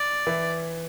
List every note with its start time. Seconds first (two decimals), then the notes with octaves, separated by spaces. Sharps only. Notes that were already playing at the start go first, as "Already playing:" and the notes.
Already playing: D5
0.27 E3 E4